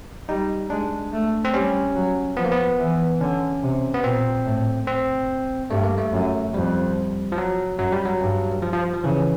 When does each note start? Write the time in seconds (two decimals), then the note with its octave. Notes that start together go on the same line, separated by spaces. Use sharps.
0.29 G3 D#4
0.70 G#3 D4
1.13 A3
1.45 C4
1.54 G3 C#4
1.95 F#3
2.37 F3 B3
2.44 A#3
2.52 B3
2.79 E3
3.20 D3 C#4
3.62 C3
3.94 B3
4.04 A#2 C4
4.45 A2
4.87 C4
5.70 G2 A3
5.84 A#3
5.98 A3
6.12 F#2
6.54 F2 G3
7.32 F3
7.38 F#3
7.79 F#2 F#3
7.93 G3
8.05 F#3
8.21 G2
8.62 F3
8.73 F3
8.94 F3
9.04 C#3 E3